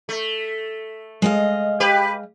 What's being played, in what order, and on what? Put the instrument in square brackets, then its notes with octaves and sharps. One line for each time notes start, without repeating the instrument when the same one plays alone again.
[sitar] A3
[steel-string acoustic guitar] G#3 D#5 F5
[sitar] G4 B4